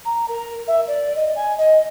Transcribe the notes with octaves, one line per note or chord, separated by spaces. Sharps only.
A#5
A#4
E5
D5
D#5
G#5
D#5